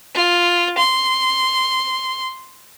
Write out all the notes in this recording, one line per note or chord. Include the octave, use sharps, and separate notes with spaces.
F4
C6